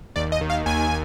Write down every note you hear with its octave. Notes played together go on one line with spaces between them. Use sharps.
D#2 D5
D#5
D#3
F5
D#2 G#5